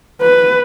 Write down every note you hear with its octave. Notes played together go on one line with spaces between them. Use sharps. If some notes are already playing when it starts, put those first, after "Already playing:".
B4